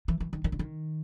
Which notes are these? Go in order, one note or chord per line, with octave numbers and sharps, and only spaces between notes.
E3
E3
D#3
D#3
D3
D#3